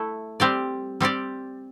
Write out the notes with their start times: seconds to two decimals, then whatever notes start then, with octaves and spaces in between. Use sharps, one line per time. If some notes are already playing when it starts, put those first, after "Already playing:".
Already playing: A3 E4 A4
0.40 G3 C4 G4 D5
1.01 G3 C4 G4 D5